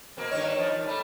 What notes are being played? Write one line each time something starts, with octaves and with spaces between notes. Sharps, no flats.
B2 A#3 C4
G2 D#3 C#5
D#2 D#3 F3
A#2
G3 A3